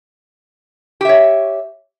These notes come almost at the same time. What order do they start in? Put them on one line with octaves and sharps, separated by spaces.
G4 E5 C#5